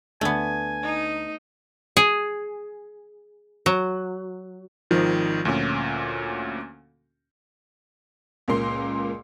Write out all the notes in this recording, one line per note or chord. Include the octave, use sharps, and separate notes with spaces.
D2 A3 B3 D4 G#5 G#6
D#4
G#4
F#3
G#1 D#3 F3
D2 A#2 C#4
C#2 A#2 A#4 C6 C7